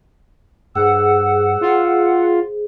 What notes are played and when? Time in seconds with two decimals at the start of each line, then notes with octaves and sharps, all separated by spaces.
0.75 G2 G#4 C5 F#5 E6
1.61 F4